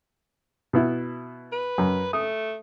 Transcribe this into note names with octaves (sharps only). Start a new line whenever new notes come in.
B2 B3 E4
B4
F#2
A3 D#6